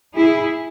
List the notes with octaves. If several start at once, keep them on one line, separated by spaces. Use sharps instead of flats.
E4 G#4